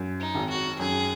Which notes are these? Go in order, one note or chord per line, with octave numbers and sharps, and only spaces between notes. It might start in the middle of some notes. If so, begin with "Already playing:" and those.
Already playing: F#2
D#4
G#1
F#4
F#2 G#4